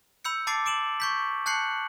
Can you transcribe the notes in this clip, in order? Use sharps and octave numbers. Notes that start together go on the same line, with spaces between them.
B5 E6 G6 C#7
A5 B5 D6 A6 C7 D7
D6 D7 E7 F#7
C#6 G6 B6
A5 F#6 G6 C7 C#7 F#7